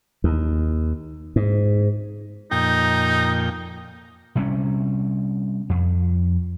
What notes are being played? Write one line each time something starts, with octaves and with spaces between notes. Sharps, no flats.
D#2
G#2
F2 A#2 D#4 G5
C3 G3 C#4
F2